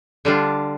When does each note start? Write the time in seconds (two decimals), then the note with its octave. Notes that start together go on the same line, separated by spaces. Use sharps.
0.25 D3 G3 D4 F4